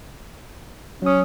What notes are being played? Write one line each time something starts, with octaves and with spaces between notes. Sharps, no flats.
F#3 C#4 D#6